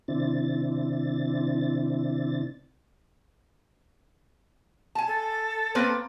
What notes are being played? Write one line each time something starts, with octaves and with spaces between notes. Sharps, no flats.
C3 D#3 C4 D4 E4 A6
G#5 A5
A4
A#3 C4 B4